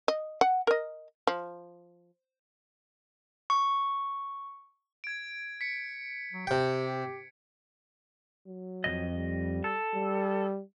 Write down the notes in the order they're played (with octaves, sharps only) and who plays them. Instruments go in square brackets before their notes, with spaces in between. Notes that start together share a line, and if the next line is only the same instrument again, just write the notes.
[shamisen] D#5
F#5
A#4 D#5
F3
[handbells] C#6
[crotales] G#6 D7
B6 C#7
[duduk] F#3
[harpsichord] C3 G5 [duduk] G4
[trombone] F#3
[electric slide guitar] F2 G#2 D#5
[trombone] G3
[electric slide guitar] A4
[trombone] G3